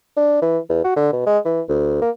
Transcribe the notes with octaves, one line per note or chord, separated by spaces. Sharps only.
D4
E3
E2
F#4
D3
B2
G#3
E3
D2
A#3